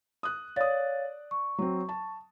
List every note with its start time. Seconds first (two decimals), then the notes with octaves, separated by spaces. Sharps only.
0.23 D#6 F#6
0.56 C#5 D5 F5 D#6 A6
1.31 C#6
1.58 F#3 C4
1.89 A5